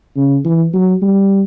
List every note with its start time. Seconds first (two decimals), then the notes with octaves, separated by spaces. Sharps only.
0.16 C#3
0.45 E3
0.73 F#3
1.02 G3